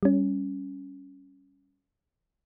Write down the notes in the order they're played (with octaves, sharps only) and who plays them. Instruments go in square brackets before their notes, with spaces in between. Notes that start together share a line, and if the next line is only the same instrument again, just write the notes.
[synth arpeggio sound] G3 C#4